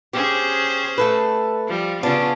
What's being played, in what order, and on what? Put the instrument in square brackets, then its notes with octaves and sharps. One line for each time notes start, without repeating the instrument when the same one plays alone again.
[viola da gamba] C#4 G#4 C5 [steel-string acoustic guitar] G4
[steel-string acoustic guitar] A3 A4 B4
[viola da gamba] F3 G3
[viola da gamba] C#3 C#4 F4 [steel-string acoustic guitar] B3 D4